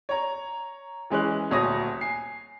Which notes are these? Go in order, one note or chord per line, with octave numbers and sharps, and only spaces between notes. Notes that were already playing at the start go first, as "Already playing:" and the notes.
C#5 A#5
E3 G#3 C#4 F#6
D#1 D2 C#5 D#6 A#6
G#5 C7